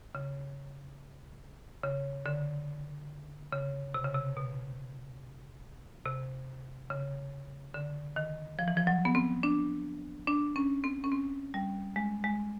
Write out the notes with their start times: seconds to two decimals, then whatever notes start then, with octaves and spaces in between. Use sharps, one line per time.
0.15 C#3
1.83 C#3
2.26 D3
3.52 C#3
3.94 C3
4.05 C#3
4.14 C3
4.37 B2
6.06 C3
6.90 C#3
7.74 D3
8.16 D#3
8.59 F3
8.68 E3
8.77 F3
8.87 F#3
9.05 B3
9.15 C4
9.43 D4
10.27 D4
10.56 C#4
10.84 C4
11.04 C#4
11.12 C4
11.54 G3
11.96 G#3
12.24 G#3